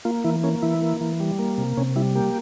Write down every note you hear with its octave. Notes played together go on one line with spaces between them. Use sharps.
A#3 F4
E3 E4
A#3 C#4
E3 E4
A#3
E3
G3
A#3
C3
C3 C#4
G3 E4
A#3 G4